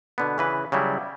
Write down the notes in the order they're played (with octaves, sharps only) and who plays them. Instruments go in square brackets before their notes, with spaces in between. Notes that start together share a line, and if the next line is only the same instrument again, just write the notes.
[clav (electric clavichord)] B2 D3 B3
C#3 E3 B4
C#3 F#3 G3 E4